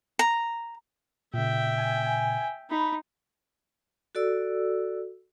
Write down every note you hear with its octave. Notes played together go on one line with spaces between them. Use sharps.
A#5
A#2 C#3 E5 G5
G#5
D#4 B5
F#4 A4 D5 E6